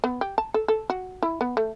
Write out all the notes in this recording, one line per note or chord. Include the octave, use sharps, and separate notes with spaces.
B3
G4
A5
A4
A4
F#4
E4
B3
A3